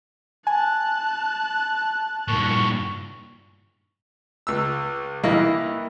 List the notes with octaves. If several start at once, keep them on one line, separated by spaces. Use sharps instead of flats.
G#5 A5 F#6
G2 A#2 C#6
C#2 E6
G2 E3 A#3 E4 D#5